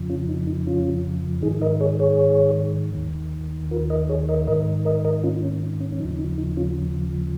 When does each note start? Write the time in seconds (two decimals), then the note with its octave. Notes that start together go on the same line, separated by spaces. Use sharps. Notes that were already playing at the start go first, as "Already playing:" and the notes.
Already playing: F2 C#3 F3
0.10 C#4 F4
0.29 D#4
0.47 D#4
0.67 C#4 F4
1.42 G#2 D#3 D#4 G#4
1.61 A#4 D#5
1.80 G#4 C#5
1.99 G#4 C#5
2.95 D#2 D#3
3.71 F4 A#4
3.90 A#4 D#5
4.09 G#4 C#5
4.29 A#4 D#5
4.47 G#2 A#4 D#5
4.51 D#3
4.85 A#4 D#5
5.05 A#4 D#5
5.23 C#4 F4
5.42 C#4
5.80 C#4
5.92 C#4
5.99 D#2 C#3 F3 D#4
6.19 D#4
6.38 D#4
6.57 C#4 F4